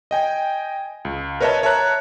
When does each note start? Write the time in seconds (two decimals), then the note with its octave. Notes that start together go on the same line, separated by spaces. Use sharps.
0.11 D#5 G5 G#5
1.05 C#2
1.41 A#4 B4 C#5 D#5 E5 A5
1.63 C#5 E5 A5 A#5 F#6